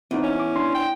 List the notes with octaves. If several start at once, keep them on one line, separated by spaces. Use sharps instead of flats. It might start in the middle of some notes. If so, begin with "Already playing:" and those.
E2 C4 D#4
C#4
D6
D4 C6
G5